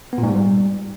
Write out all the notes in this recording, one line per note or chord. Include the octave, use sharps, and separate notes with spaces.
B3
A#2
G#2
G3